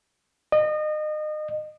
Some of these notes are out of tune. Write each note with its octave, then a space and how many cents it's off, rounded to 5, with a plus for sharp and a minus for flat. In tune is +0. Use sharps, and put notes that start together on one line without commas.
D#5 -30